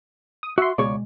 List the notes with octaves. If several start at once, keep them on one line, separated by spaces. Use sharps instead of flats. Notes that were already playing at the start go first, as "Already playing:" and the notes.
D#6
F#4 E5 C6
C#2 B2 G#3 C#5 D5